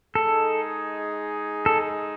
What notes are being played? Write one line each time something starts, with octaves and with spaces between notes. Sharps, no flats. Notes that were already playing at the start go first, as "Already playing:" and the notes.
G#3 D#4 G#4 A4
A4